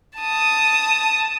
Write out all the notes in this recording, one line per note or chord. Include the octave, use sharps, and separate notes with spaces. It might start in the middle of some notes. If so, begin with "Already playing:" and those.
A5 D#6